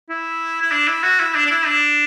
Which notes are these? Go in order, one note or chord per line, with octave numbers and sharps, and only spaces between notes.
E4
E4
D4
E4
F#4
E4
D4
D4
E4
D4